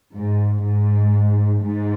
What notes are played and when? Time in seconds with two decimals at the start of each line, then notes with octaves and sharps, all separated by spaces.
0.14 G#2
0.63 G#2
1.62 G#2